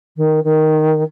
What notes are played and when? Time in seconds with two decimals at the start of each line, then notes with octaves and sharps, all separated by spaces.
0.16 D#3
0.44 D#3